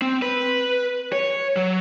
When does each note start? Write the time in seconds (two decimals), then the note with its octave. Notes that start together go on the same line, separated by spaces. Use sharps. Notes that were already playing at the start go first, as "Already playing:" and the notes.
0.02 C4
0.22 B4
1.12 C#5
1.57 F#3